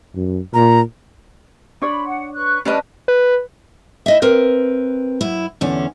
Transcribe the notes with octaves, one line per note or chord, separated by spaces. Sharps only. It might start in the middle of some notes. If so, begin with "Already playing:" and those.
F#2
A#2 A#5
D4 C#5 D5 B5 C6
F#5
B4 C#6 F#6
G3 C#4 D4 B4 D5 D#5 F#6
B4
E4 D#5 E5
C4 A#4 B4
F#2 E4
E2 D3 C#4